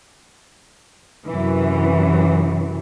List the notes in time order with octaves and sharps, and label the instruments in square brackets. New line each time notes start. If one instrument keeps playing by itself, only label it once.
[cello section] F#2 C3 E3